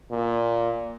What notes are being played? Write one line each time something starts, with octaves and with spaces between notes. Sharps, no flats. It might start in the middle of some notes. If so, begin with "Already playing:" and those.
A#2